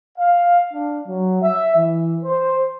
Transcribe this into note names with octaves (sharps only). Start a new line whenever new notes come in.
F5
D4
F#3
E5
E3
C5